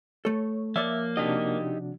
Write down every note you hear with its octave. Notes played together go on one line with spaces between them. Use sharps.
A3 A4 C#5
F3 A#3 C#5 D5 E5
C3 D4 D#4 F#4 G4 D#5